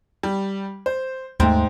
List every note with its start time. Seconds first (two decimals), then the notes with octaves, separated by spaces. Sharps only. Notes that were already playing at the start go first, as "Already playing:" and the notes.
0.23 G3
0.86 C5
1.40 D#2 G#2 A3 C4